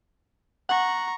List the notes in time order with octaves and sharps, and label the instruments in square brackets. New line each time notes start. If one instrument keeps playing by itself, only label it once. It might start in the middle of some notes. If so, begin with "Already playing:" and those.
[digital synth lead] F#5 [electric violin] A#5 C#6